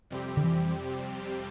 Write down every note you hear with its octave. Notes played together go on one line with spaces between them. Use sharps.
F2 C3 G3 C4 G4
D3
E3